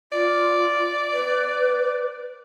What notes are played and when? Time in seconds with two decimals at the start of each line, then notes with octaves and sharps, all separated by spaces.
0.12 F4 D5
1.12 B4